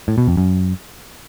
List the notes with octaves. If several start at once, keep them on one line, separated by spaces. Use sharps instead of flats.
A2
B2
F2
F#2